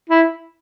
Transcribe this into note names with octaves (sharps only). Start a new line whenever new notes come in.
E4